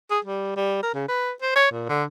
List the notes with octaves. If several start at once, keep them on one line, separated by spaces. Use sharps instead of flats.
G#4
G3
G3
A#4
C#3
B4
C5
C#5
A#2
D3